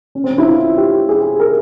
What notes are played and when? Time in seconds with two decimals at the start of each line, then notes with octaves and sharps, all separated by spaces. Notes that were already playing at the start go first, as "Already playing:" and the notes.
0.15 C#4
0.24 C4
0.31 C#4
0.38 E4
0.47 F4
0.78 G4
1.09 G#4
1.40 A#4